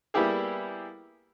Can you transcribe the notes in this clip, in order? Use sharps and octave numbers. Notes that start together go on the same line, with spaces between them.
G3 A#3 B3 E4 G4 G#4